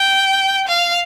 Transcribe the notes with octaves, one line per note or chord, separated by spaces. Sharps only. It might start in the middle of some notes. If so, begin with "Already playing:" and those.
Already playing: G5
F5